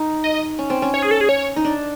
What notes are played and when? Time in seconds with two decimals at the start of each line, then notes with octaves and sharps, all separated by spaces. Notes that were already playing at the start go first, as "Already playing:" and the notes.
Already playing: D#4
0.24 D#5
0.59 C#4
0.70 C4
0.82 C#4
0.94 C#5
1.02 G#4
1.11 A4
1.21 G#4
1.29 C#5
1.56 D#4
1.65 D4